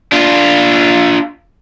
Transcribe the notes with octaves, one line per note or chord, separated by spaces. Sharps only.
D4 F4